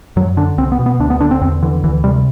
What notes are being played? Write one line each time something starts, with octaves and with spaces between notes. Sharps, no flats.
F#2 F#3
D3 D4
C2 C4
B3
B2
B3
D2 D4
B3
D3 D4
C4
E2 C4
D3 E3
D2 E3
C3 G3